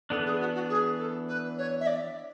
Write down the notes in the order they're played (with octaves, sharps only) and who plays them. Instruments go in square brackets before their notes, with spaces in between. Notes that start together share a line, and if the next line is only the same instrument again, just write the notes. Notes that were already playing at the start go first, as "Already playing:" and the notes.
[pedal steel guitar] E3 B3 D4 [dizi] A4
[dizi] G#4
F#4
F#4
G#4
A4
B4
C#5
E5
D5